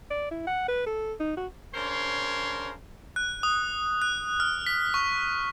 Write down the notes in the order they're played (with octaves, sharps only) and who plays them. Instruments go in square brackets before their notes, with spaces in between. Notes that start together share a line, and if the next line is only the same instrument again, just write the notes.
[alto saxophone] D5
E4
F#5
B4
A4
D#4
F#4
[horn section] C#3 D4 A#4 C5 C#5 C6
[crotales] F#6
D#6
F#6
F6
B6
C#6